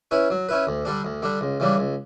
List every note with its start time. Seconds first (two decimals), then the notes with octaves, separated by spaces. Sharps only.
0.11 C#4 E4 B4
0.30 F#3
0.49 C#4 E4 B4
0.67 D2
0.85 D3 G3 D4
1.05 D2
1.22 D3 G3 D4
1.41 C#2
1.60 C#3 E3 G3 D4
1.78 C#2